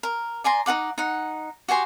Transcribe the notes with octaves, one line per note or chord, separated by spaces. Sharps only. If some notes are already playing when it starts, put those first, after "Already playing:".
A#4
D5 G#5 A#5 C6
D#4 A4 F#5 D6
D#4 F#5
F#4 G4 G#5 C6